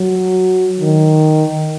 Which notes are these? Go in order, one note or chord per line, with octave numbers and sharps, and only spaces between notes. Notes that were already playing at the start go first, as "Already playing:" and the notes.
Already playing: F#3
D#3